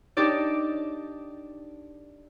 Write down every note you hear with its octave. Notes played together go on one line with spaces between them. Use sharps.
D4 D#4 G4 A4 D5